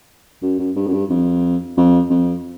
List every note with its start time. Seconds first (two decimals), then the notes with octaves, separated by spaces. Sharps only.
0.42 F#2
0.59 F#2
0.76 G2
0.87 F#2
0.93 G2
1.10 F2
1.77 F2
2.10 F2